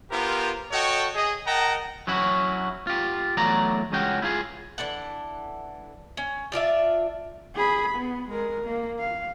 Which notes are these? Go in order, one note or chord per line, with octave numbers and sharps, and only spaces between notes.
B3 F4 G4 A#4 C5
F#4 A4 C#5 D#5 G5 C#6
G#4 D#5
A#4 D#5 F#5 G5 A5 A#5
F#3 C#4 E4 F#4
F4 G4
E2 F#3 A3 D5 A#5
C#2 G#3 C#4 F#4 G5
E4 F4 G#4
E3 D4 A4 F#5
C#4
D4 F4 D5 E5
G#4 B5
B3
G#3 A#4
A#3
F5